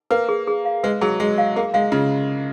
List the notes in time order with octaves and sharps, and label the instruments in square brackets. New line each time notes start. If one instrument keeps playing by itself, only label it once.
[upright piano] A#3 [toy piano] B4
[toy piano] G#4
G#4
F5
[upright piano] G#3 [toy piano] B4
[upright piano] F#3 [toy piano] G#4
[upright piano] G#3 [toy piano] G#4
[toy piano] F5
[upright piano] A#3 [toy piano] G#4
[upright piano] G#3 [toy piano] F5
[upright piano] C#3 [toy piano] F4